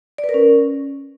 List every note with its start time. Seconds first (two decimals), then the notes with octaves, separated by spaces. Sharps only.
0.18 D5
0.24 B4
0.29 A#4
0.34 C#4